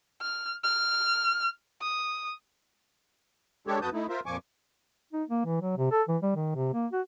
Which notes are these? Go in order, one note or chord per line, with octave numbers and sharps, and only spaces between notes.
F6
F6
D#6
G#3 D4 G4 A4 C#5
F2 F#4 B4 A5 D#6 G6
A3 D#4 E4
F4 A#4 C5 E5
F2 A#2 F3 G#5 C#6 D6
D#4
A#3
E3
F#3
C3
A4
E3
G3
D#3
C3
A#3
F#4